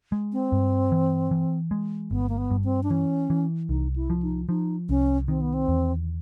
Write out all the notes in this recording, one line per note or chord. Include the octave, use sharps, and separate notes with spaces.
G#3
C4
G2
E3
E3
G#3
G1 B3
A#3
B3
G2
C4
D4
E3 C#4
E3
C2 D#4
E4
F3
D#4
F3 D#4
C2 C#4
D#3 C4
B3
C4
E2